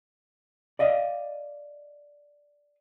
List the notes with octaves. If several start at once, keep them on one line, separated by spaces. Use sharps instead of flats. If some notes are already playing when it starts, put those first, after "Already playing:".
D5 D#5 F5